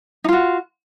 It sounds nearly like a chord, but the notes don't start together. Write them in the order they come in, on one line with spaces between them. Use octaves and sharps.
D#4 F4 F#4